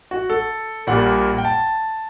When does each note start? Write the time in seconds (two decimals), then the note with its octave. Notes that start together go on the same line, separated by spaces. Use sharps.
0.11 F#4
0.30 A4
0.87 A#1 A#2 G3 A#3 F#5
1.38 G5
1.45 A5